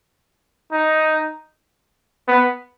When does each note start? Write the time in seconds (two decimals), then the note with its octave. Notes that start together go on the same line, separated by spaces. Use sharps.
0.72 D#4
2.28 B3